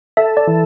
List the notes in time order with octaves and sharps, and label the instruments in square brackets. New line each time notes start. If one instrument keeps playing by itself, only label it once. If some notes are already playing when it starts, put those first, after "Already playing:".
[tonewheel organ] A4 [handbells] E5
[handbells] D5
[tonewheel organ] E3